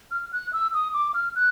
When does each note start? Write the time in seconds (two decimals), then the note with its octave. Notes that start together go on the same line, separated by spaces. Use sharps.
0.11 F6
0.33 F#6
0.53 E6
0.74 D#6
0.94 D6
1.14 F6
1.36 F#6